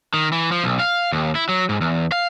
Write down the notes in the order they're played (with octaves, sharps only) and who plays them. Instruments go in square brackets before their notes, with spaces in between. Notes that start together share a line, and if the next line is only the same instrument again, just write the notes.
[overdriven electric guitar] D#3
E3
F3
B1
F5
D#2
E4
F#3
G#2
E2
F5